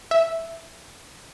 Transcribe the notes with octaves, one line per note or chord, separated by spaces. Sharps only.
E5